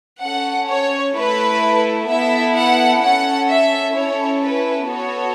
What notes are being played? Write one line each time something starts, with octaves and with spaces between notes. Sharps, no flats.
C#4 A4 F#5
C#5
A3 E4 A4 B4
B3 E4 A4 E5
F#5
C#4 A4 F#5
E5
C#4 E4 A4 C#5
B4
B3 F#4 A4 C#5